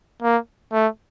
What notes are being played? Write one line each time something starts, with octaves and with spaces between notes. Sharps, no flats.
A#3
A3